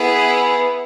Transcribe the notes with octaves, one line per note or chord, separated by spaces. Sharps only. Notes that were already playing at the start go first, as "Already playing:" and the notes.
Already playing: B3 E4 G#4